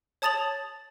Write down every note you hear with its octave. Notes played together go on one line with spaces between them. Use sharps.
C#5 A5 D#6 A6 F7 F#7